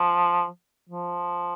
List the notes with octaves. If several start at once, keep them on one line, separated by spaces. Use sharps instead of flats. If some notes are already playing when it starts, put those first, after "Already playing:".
Already playing: F3
F3